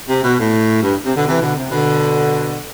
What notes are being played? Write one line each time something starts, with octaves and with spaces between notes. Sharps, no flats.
C3
B2
A2
G2
C3
B2 D3
C3 E3
B2 D3
C3
B2 D3